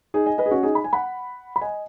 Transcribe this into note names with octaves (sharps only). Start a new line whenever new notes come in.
D#4 G#4
D#5 G#5
B4 D#5
G#4
C#4 F#4
D#4 G#4
B5
G#5
F#5 B5
B5
D#5 G#5